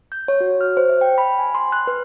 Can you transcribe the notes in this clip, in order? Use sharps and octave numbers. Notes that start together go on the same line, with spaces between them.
G6
C#5
F#4
F6
C5
E5
G5
B5
G#5
C6
F#6
B4